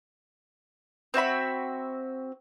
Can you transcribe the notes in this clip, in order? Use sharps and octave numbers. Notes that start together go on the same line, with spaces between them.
C4 F#4 E5 B5